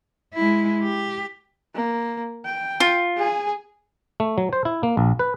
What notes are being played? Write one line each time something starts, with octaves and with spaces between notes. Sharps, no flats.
G#3 E4
G4
A#3
G5
F4
G#4 G#5
A3
F#3
C5
E4
A#3
A#1
B4